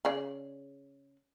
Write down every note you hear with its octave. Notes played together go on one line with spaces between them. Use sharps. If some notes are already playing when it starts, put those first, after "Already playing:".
C#3 G#4 D5